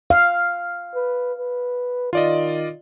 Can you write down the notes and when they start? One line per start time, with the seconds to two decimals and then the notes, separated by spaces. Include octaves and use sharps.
0.10 F5
0.95 B4
1.38 B4
2.13 D#3 F4 D5 D#5